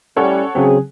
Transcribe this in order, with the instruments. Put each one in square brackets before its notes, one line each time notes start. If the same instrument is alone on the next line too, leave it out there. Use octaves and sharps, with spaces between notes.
[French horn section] A2 G3 [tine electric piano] C#4 [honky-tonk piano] A4 C#5 F#5
[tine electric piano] C#3 F#3 C4 [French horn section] G#4